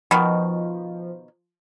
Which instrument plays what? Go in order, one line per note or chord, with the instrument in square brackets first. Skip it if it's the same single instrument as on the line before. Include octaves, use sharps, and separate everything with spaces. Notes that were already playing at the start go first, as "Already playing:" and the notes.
[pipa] B2 D#3 [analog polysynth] F3